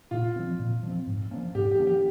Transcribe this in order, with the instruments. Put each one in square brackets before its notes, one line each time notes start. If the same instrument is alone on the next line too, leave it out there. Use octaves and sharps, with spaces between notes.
[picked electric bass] A#2 [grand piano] F4
[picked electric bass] F3 C4
A#2
F3 C4
G#2
F3 A#3 C#4
[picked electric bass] G#2 [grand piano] G4
[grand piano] G4
[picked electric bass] F3 A#3 C#4
[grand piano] G4